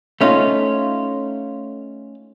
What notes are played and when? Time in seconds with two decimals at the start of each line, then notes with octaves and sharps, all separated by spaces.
0.21 A3 C#4 D#4 F4